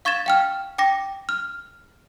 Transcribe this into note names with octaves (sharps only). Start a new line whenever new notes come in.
F5 C#6 G#6 A6 E7
F5 G5 F6
G5 D6 A#6
F6